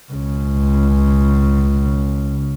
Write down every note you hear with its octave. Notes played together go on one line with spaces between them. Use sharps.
C#2 C#3